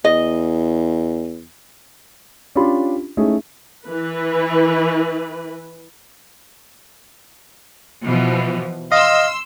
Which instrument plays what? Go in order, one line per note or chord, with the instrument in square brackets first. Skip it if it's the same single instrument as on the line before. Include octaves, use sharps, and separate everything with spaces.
[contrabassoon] E2 [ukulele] D#5
[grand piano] C#4 D4 F4 G4 B5 C6
A3 C#4 D#4 E4 G#4
[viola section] E3 B4
[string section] B2 E3 F3
[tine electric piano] D#5 [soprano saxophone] F5 [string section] C6 E6